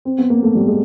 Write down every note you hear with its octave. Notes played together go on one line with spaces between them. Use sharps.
C4
B3
A#3
A3
G3
G#3